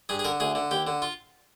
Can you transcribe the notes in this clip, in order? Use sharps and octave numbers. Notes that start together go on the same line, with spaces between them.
G2 G#4
G#4
D3 A#4
D2 G#4
D3
D#2 G4
D3
F4